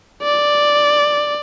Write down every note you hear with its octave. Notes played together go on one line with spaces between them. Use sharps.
D5